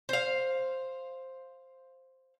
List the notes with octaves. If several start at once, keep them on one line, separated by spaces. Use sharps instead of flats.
C5 F5